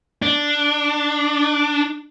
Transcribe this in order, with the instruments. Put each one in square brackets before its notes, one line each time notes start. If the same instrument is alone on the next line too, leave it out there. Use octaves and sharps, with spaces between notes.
[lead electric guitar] D4